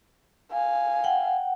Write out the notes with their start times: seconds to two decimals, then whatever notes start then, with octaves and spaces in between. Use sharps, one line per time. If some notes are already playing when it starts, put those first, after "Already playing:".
0.51 F5 G#5
1.04 F#5 G5